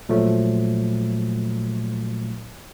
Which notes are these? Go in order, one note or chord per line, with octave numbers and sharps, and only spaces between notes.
A#2 F3 F#3 A3